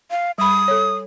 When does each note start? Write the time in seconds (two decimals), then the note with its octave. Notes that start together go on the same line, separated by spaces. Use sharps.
0.11 F5
0.38 G3 B5 D#6
0.68 A4 C#5